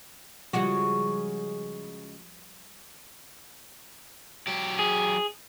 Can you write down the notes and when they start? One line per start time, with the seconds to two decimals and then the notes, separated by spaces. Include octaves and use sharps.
0.53 C#3 F3 G3 G#3 F#4
4.47 F#3 G4
4.79 G#4